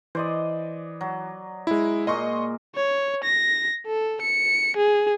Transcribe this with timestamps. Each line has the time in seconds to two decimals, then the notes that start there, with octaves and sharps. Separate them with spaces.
0.15 E3 C5 D5 D#5
1.01 F#3
1.67 G#3 E4
2.07 A#2 G#3 D#5 C6 C#6
2.75 C#5
3.24 A#6
3.87 A4
4.21 C#7
4.77 G#4